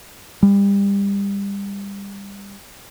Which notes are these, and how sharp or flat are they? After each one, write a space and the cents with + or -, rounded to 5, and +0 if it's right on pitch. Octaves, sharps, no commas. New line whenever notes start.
G3 +30